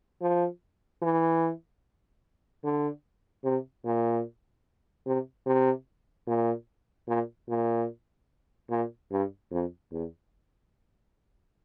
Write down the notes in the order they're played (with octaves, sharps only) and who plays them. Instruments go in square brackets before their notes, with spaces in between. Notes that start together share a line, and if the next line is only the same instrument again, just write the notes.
[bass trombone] F3
E3
D3
C3
A#2
C3
C3
A#2
A#2
A#2
A#2
G2
F2
E2